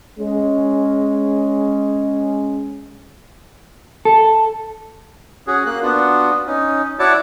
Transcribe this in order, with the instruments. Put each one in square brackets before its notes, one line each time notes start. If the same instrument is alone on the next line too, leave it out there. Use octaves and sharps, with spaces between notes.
[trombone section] G#3 C#4
[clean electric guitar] A4
[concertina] C#4 F#4 G#4
A#3 F#6
B3 D4 F4 F#4
C#4 D#4
E4 F#4 C#5 D5 A5